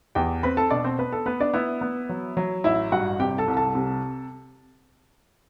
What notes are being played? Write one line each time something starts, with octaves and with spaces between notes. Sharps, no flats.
E2 G4 G5
C4 B4 B5
A4 A5
B2 D4 D5
C4 C5
B3 B4
A4
B3 B4
D4 D5
B3 E4 E5
B3
F#3
F#3
A1 E4 E5
G2 F#4 F#5
C3 G4 G5
A4 A5
C2
A4 A5
C3